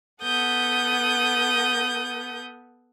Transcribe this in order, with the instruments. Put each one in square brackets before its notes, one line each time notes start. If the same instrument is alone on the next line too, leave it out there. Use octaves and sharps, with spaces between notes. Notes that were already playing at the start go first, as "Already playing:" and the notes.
[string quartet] B3 A4 F#5 [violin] D#6 G6